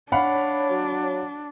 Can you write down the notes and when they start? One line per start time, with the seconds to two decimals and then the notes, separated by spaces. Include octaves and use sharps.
0.12 D4 C#5 F5 F#5 B5
0.70 F#3